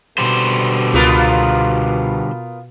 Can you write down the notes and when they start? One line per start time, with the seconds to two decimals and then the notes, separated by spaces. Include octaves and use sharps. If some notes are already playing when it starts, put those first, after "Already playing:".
0.18 B2 D3 G3 C5
0.94 C#2 B3 F4 A#4